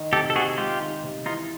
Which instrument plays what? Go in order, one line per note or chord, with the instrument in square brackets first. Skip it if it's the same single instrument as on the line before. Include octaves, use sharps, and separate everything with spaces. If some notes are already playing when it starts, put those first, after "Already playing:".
Already playing: [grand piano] D#3 D#4
[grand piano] C3 [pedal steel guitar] G4 A4
[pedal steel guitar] A4
[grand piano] C3 [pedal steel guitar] F#4 G#4
[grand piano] G#3 [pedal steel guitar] F4 G4
[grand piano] D#3
C3
[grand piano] E3 [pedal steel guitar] D#4 F4